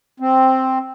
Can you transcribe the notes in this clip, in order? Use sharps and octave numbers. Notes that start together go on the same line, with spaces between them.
C4